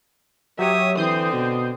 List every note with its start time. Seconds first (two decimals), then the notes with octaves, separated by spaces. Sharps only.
0.59 F#3 G4 C#5 E5 D#6
0.97 D3 E3 C4 D#6 G6 C7
1.33 B2